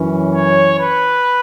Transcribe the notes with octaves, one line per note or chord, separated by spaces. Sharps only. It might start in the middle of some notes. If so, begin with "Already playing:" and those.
Already playing: F#2 E3 C#4
C#5
B4